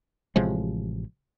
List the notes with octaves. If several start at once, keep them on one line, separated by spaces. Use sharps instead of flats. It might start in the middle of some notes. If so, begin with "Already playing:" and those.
A1 C3 F3 G#3